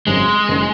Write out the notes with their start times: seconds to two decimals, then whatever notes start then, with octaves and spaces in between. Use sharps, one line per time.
0.07 G#1 F#2 C#3 F#3 G#3 C#4
0.48 F#1 D#3 A#3 C#4